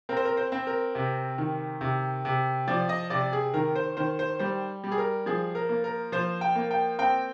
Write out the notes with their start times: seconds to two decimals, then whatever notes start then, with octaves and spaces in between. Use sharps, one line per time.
0.09 C4 A#4
0.17 C5
0.25 A#4
0.37 C5
0.52 C4
0.67 A#4
0.95 C3
1.38 D#3
1.81 C3
2.25 C3
2.68 F3 D5
2.89 D#5
3.10 C3 D5
3.33 G#4
3.54 D#3 A#4
3.76 C5
3.97 D#3 C5
4.19 C5
4.39 G3 C5
4.84 G3
4.92 G#4
4.98 A#4
5.26 F3 G#4
5.55 A#4
5.69 A#3
5.84 A#4
6.12 F3 C5
6.41 G5
6.56 A#3
6.71 G5
6.99 C4 G5